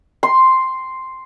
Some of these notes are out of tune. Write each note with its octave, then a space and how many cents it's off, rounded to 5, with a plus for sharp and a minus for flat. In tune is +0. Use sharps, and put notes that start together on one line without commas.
C6 +0